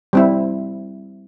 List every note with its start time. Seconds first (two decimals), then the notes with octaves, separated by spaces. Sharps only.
0.13 G3 C4 E4